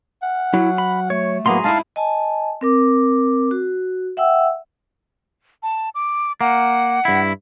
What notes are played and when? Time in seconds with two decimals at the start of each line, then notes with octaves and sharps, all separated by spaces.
0.22 F#5
0.54 F#3 E4
0.78 B5
1.10 A3 C#5
1.46 A2 F#3 A#3 B3 G#4 A#5 C6
1.64 G#2 D#4 E4 F5 A5
1.96 D#5 G#5 A5
2.61 C4 A#4 D6
3.51 F#4
4.17 E5 F#5 G5 E6
5.63 A5
5.95 D6
6.41 A#3 F#5
7.05 G2 E4